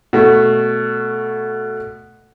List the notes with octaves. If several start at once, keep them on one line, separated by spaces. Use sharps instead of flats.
B2 A3